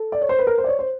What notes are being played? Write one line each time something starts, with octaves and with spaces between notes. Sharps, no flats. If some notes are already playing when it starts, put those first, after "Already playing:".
Already playing: A4
D5
C#5
C5
B4
A#4
C5
D5
C#5
C5